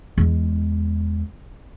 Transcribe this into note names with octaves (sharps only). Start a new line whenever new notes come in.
E2 G#3